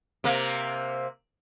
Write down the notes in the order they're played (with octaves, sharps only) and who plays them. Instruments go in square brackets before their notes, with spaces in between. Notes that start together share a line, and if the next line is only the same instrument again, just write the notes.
[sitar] C3 A#3